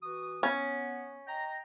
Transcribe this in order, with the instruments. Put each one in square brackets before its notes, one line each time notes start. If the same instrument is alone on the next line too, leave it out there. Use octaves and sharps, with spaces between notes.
[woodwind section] E3 F#4 D#6
[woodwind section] B3 [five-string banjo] C#4
[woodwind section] D#5 G5 A#5